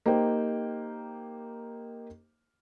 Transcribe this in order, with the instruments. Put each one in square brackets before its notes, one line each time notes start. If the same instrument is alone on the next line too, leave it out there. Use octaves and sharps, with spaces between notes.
[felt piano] A#3 D#4 G4 C5 G5